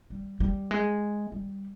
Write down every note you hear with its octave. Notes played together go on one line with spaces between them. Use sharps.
G3
G3
G#3
G3